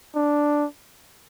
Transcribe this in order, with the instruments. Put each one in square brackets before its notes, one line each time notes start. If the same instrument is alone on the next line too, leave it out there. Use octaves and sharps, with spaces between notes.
[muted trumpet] D4